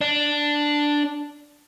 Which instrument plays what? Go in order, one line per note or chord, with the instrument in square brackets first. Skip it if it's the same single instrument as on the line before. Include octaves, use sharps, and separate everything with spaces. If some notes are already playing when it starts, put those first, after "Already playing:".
[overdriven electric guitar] D4